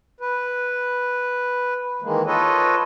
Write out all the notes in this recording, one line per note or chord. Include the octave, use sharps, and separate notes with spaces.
B4
D#3 E3 G#3 A#3
F4 A4 B4 C#5 D#5